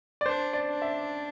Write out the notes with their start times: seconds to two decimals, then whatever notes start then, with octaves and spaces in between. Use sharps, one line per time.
0.21 D5
0.26 D4 C5
0.53 D5
0.68 D4
0.82 E5